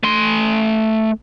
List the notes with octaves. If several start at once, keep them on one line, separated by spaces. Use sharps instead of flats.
A3 C6